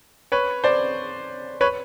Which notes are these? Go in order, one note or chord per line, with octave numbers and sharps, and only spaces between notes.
B4 C#5
C5 D5
B4 C#5